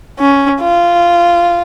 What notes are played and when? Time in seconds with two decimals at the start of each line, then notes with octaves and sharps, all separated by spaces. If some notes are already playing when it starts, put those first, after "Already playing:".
0.19 C#4
0.61 F4